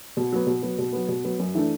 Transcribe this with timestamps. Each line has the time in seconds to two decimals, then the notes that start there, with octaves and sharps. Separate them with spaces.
0.17 B2
0.32 F#3 B3
0.47 B2
0.63 F#3 B3
0.78 B2
0.93 F#3 B3
1.08 B2
1.24 F#3 B3
1.39 F#2
1.55 E3 A3 D4